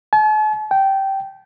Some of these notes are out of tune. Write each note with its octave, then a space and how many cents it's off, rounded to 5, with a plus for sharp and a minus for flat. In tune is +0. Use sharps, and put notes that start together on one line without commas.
A5 -45
G5 -15